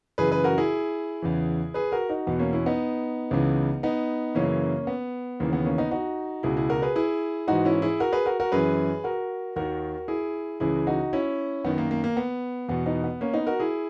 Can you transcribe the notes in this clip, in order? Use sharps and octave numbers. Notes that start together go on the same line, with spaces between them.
F#2 C#3 E3 G#4 B4
G#4 B4
F#4 A#4
E4 G#4
E2 C#3 E3
G#4 B4
F#4 A#4
D#4 F#4
E2 B2 B3
A#3 C#4
C#4 E4
B3 D#4
C#2 C#3 E3
B3 D#4
F#2 C#3 E3 A#3 C#4
B3
D#2 C#3 E3 A#3
B3
A#3 C#4
B3 D#4
D#4 F#4
C#2 B2 E4 G#4
E4 G#4
F#4 A#4
G#4 B4
E4 G#4
G#2 E3 D#4 F#4
C#4 E4
E4 G#4
F#4 A#4
G#4 B4
F#4 A#4
F#4 A#4
F#2 E3 G#4 B4
F#4 A#4
D#2 D#3 F#4 A#4
E4 G#4
C#2 C#3 E3 E4 G#4
D#4 F#4
C#4 E4
F#2 D#3 B3
A#3
A#3
A#3
B3
E2 B2 B3
B3 D#4
B3
A#3 C#4
B3 D#4
F#4 A#4
E4 G#4